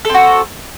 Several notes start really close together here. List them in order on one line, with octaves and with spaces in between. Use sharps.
A4 C4 F#4